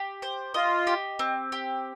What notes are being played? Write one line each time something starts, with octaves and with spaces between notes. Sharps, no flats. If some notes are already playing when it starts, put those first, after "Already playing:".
Already playing: G4
C5
F4 D#5
G4
C4
G4